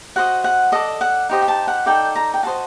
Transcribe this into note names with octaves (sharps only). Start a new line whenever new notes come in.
F#4 C5 D#5 F#5
F#5
A4 D5 D#5
F#5
D#4 G4 C5 D#5
G5
A5
F#5
D#4 A4 D5 G5
A#5
G5
F#4 A4 C5 D#5 A5